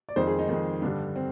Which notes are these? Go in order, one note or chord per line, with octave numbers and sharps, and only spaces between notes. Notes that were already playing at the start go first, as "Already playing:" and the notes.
D5
F2 D#3 G#3 C5
G#4
D#4
F2 D#3 G#3
G2 D3 G3 D4
C4